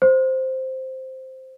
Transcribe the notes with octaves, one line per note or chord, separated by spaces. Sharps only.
C5